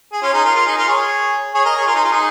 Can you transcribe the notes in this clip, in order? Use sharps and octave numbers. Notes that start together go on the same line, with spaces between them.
G#4
C#4 F4
D#4 G#4
F4 A#4
F4 A#4
D#4 G#4
F4 A#4
G#4 C#5
G#4 C#5
A#4 D#5
G#4 C#5
F4 A#4
D#4 G#4
F4 A#4
D#4 G#4